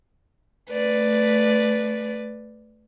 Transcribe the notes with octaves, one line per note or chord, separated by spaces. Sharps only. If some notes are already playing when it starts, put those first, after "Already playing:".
A3 B4 D5